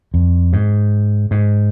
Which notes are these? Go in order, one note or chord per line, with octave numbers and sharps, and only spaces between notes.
F2
G#2
G#2